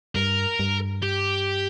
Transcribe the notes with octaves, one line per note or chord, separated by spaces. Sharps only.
G2 A#4
G2
G4